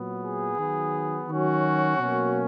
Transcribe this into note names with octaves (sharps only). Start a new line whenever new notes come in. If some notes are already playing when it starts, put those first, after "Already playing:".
Already playing: A#2 F#3 B3
G#4
D#3 F#3 B3
D#3 F#3 C#4 F#4
B2 F#3 A#3 C#4